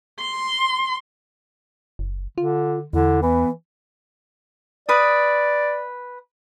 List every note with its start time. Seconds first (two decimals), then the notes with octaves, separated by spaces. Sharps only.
0.20 C6
1.99 F#1
2.38 D3 F4
2.93 E2 D3 E4
3.22 E3 B3
4.89 B4 D5 D#6